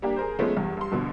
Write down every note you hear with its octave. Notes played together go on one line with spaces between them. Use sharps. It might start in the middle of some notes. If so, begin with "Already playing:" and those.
G3 A#3 D4 G4
G#4 A#4 C5
F3 G#3 A3 B3 C#4
E2 G2
G2 C6
A#1 B2 D3